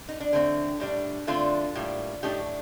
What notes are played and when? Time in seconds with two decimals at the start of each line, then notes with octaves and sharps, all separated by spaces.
0.09 D#4
0.20 D4
0.33 D3 A3 C4
0.80 A2 G3 D4
1.27 D3 A3 C4 D4 F4
1.75 A2 G3 A#3
2.23 A2 A3 D4 D#4 G4